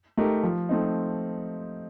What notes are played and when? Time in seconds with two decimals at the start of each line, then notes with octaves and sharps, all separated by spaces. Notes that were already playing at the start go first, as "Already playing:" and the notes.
0.17 A3 D#4 G4 A#4
0.43 F3
0.69 A3 C4 D#4